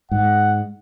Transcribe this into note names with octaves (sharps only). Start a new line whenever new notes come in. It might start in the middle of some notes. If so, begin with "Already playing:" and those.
G#2 F#5